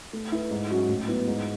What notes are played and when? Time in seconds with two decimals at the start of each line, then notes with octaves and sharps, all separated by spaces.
0.13 A3
0.32 E4 B4
0.51 G#2
0.70 F#3 C#4 F#4
0.88 A2
1.07 F#3 B3 E4 B4
1.27 G#2